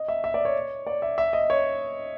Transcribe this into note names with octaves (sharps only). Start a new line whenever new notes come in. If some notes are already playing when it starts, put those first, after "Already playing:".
Already playing: D#5
E5
E5
D5
C#5
D5
E5
E5
D#5
C#5